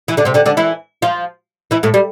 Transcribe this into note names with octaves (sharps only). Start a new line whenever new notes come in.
E3 E4
D3 D4
C3 C4
D3 D4
D3 D4
E3 E4
F3 F4
E3 E4
A2 A3
G3